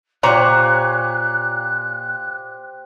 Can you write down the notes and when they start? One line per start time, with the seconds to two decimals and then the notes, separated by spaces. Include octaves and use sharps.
0.23 A#2 G4 C5 C#5 A#5 F#6